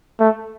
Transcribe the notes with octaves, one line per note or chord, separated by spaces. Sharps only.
A3